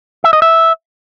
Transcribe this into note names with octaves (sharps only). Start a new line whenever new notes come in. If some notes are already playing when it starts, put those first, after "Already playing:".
E5
D#5
E5